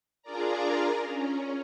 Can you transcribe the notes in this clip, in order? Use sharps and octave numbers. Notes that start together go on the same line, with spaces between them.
D4 F4 G#4 A#4 D5 A#5
C#4